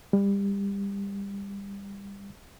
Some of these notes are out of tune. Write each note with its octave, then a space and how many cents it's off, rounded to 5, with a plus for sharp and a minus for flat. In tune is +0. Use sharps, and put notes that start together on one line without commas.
G3 +25